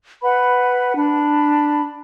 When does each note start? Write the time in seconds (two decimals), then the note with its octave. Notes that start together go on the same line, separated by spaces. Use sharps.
0.23 B4 F#5 B5
0.96 D4 B5